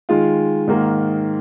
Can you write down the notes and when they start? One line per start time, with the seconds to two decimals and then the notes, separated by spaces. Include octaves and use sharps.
0.09 D#3 G#3 F4
0.67 G#2 D#3 A#3